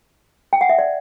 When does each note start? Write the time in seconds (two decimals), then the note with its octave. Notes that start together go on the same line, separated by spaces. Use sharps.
0.53 G5
0.61 F#5
0.69 E5
0.78 D5